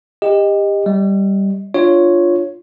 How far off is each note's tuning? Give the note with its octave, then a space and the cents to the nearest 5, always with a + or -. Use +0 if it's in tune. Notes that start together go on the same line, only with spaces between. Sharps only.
G4 +25 D#5 +0
G3 +0 D#5 +20
D4 +25 F4 +0 C#5 +0